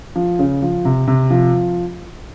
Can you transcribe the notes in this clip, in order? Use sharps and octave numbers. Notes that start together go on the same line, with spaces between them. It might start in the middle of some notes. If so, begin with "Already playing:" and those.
F3
C#3
F3
C3
C3
F3